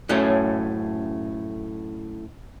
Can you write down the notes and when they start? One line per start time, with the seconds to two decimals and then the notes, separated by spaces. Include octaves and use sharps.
0.09 F#2 A2 A3 C#4